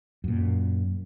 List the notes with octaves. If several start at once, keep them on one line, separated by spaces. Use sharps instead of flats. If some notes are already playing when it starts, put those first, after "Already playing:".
F#2 A#2